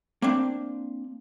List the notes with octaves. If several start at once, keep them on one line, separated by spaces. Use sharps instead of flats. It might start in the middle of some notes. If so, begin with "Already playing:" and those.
A#3 C4 D4